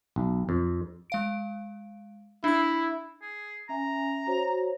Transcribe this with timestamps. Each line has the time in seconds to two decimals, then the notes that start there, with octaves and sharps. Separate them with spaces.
0.16 B1
0.49 F2
1.10 G#3 F5 D7
2.44 D4 E4 E6
3.22 G#4
3.69 C#4 E5 G#5 A#5
4.27 F#4 C5 C#5